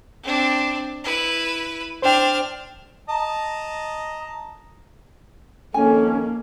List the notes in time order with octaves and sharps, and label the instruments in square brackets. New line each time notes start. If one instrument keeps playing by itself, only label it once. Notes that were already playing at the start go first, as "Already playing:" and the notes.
[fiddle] C4 D4
E4 B4
[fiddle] D4 F6 [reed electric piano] C5 G5
[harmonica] D#5 A5 A#5
[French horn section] F2 D#3 A4 [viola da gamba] A#3 [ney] C#4 [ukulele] G#5